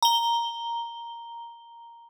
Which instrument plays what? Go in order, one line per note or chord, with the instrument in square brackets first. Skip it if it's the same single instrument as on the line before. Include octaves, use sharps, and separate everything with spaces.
[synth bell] A#5 G7